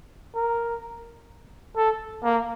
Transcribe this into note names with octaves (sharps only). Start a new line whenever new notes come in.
A#4
A4
A#3